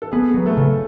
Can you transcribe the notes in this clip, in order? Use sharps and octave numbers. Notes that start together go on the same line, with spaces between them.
A4
B3 G#4
F#3 B4
A3 A4
C#3